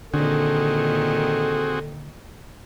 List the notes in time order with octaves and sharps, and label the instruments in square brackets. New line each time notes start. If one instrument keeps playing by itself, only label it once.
[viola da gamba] A#2 D#3 [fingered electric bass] D3 [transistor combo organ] C4 F#4 G#4 [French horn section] A4